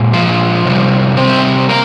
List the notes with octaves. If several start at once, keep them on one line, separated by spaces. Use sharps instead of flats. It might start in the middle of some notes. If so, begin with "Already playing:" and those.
Already playing: A#2 G#3
F3 F4
C3 D#3 G3
C4 C5
A#3 A#4